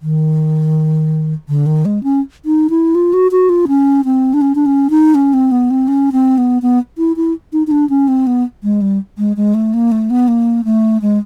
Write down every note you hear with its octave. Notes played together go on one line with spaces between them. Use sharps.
D#3
D3
D#3
G#3
C#4
D#4
E4
F4
F#4
F#4
F4
C#4
C4
D4
C#4
D4
C#4
D#4
C#4
C4
B3
C4
C#4
C4
B3
B3
E4
E4
D#4
D#4
D4
C#4
C4
B3
G#3
G3
G#3
G#3
A3
A#3
A3
B3
A#3
A3
G#3